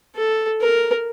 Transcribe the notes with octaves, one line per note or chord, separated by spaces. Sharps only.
A4
A#4